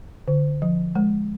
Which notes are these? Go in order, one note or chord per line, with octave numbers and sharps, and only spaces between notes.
D3
F3
G#3